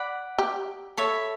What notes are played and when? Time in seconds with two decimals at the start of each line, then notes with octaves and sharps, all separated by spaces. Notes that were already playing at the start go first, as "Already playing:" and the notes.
Already playing: D5 F#5 B5
0.38 G4
0.97 A4 C#5 E5 B5